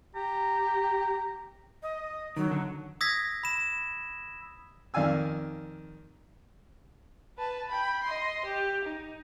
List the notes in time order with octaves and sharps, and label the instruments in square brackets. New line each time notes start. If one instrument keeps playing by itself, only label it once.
[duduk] G4 [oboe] A#5
[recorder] D#5
[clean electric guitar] D#3 [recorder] F#3
[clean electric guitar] D3
[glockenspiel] D#6 E6 G#6 A#6 B6
B5 E7
[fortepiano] F2 D#3 D5 F5 G#5 E6
[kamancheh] B4 A5
G5 B5
D#5 C6
G4
D#4